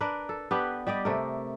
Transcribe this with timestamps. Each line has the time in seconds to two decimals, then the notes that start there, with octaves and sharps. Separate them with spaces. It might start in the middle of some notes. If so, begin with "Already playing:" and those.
0.01 D4 A#4 B4
0.29 A4
0.51 B3 D4 G4 B4
0.87 G3 G4 D5 D#5
1.05 C3 A3 A#4